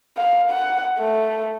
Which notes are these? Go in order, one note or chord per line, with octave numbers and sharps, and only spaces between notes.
F5
F#5
A3